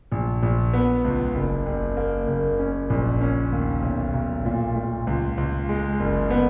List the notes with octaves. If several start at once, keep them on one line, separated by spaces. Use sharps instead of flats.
A#1
A#1
B3
C#2
F#1
F#1
A#3
F#1
C#4
A#1
C#4
D#2
B1
B1
A#2
A#2
C#2
C#2
G#3
F#1
B3